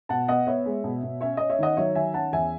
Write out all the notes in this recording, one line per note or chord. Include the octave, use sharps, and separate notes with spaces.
B2 F#5 A5
B3 D#5 F#5
B3 C#5 E5
G#3
B2
B2
C#4 C#5 E5
C#4 D#5
C#5 E5
D#3 D#5 F#5
F#3 C#5 E5
D#3 E5 G#5
C#4 F#5 A5
E2 E5 G#5